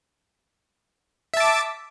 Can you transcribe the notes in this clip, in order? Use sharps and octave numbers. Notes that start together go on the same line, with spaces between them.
E5 A5 D6